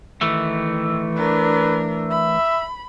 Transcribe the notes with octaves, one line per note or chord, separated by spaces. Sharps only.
D#3 E3 A3
D4 A#4 B4
E5 B5